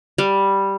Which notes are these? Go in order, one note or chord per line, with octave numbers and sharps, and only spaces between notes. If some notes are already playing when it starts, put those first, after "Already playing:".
G3